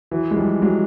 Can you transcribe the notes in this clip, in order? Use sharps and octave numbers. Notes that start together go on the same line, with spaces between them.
E3 F#3
G#3
F3 G3
F#3 G#3